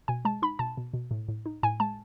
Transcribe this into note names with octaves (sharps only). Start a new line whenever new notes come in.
B2 G#5
G#3 A5
D#4 B5
B2 A5
B2
B2
A2
A2
D#4
A2 G#5
G#3 A5